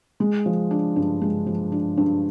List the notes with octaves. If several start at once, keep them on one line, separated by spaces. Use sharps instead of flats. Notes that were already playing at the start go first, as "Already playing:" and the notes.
G#3
F3
D4
G2
G#3
F3
D4
G2